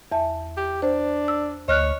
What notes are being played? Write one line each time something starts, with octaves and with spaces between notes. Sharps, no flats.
E2 E5 A5
G4
D4 C5
E6
D2 C#5 D#5 F6 F#6